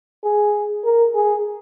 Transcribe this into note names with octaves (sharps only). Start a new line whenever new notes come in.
G#4
A#4
G#4